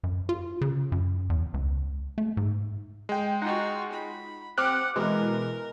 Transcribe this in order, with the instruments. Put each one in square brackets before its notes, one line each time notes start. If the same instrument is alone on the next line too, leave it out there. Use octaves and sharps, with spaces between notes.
[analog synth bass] F#2
F4
C#3
F#2
E2
C#2
A3
G#2
[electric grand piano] G#3 G5
[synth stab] D#4 F#5 [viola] F4 F#4
[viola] B5
[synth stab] C4 G4 [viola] F#5 [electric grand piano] D6 F6 F#6
[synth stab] B2 E3 G#3 [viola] A#4